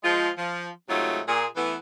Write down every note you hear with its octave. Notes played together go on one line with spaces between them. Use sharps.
F3 G#3 F4
F3
G#2 C3 F#3 A3 D#4 F4
A#2 G#4
E3 A3 B3